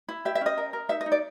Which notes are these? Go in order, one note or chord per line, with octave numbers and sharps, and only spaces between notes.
E4
G4 E5
E5
C#4 D#5
A#4
A#4
D#4 E5
D#5
D#4
D5